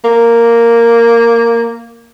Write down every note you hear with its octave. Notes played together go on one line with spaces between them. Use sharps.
A#3